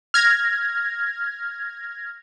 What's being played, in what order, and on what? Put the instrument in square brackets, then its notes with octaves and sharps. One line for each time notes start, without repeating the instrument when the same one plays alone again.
[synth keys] F6 G#6 A#6